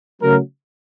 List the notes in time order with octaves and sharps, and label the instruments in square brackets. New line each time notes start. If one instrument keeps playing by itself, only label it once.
[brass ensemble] C#3 F#3 A3 A#4